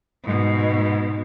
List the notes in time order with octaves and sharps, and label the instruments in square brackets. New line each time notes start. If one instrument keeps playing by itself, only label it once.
[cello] G#2 B2